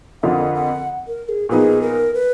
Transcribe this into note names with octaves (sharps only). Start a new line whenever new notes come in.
F2 D3 F3 A#3 F4 F#5
F#5
A#4
G#4
A#2 F3 B3 D#4 G#4
A#4
B4